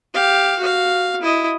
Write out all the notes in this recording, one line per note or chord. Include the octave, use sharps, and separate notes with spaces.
G4 F5
F#4 F5
E4 D#5